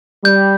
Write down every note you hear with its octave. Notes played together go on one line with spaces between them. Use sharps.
G3 G6